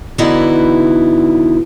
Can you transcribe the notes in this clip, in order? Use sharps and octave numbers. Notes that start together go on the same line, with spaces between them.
D3 E3 B3 D#4 E4 F#4